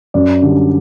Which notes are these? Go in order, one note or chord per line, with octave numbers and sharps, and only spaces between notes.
F#2 D5
D3 G3